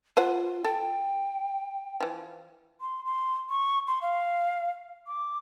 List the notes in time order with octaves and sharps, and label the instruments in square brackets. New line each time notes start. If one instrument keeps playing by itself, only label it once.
[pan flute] F4 [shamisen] B4 C5 F#5
[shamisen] A4 [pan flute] G5
[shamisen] E3 F3
[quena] C6
C6
C#6
C6
F5
D6